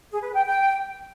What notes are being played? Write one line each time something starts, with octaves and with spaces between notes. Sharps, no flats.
G#4
B4
G5
G5